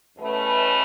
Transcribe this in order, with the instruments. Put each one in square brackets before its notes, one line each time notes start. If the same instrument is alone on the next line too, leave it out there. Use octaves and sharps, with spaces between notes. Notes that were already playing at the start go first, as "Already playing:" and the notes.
[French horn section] E2 B2 A3 C#4 B4